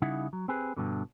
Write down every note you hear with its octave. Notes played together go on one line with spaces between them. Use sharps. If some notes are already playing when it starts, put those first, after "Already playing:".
C#3 G3 D#4 E4 F#5
F#3
C4 G4 G#4 B4
G2 B2 D3